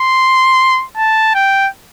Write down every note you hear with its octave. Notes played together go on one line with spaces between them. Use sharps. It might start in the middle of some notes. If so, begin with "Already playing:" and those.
Already playing: C6
A5
G5